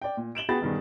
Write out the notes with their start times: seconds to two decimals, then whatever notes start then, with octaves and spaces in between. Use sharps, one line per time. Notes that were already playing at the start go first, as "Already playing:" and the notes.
0.02 D5 G5
0.17 A#2
0.35 D7 E7 F#7 G7
0.49 B3 F#4 G#4 G5 B5 A6
0.61 E1 G2 D#3 B3 G#4